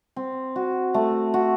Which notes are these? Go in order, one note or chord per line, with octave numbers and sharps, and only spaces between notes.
C4
F#4
A3
F#4